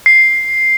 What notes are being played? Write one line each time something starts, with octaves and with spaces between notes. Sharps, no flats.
C7